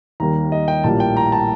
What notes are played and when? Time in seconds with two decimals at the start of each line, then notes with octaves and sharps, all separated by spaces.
0.20 D#2 D#3 G3 A#3 A#5
0.52 D#5
0.68 G5
0.84 A#1 A2 G3 A#3 A5
1.00 G5
1.17 A#5
1.32 A5